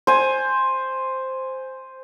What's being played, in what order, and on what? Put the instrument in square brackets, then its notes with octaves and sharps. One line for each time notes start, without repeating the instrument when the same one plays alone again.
[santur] C5 G#5